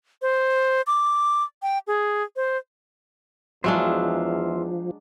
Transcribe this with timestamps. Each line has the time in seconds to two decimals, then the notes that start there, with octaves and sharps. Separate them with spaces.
0.22 C5
0.87 D6
1.62 G5
1.87 G#4
2.36 C5
3.64 E2 F3 F#3 G#3 D4 C5 E5 F5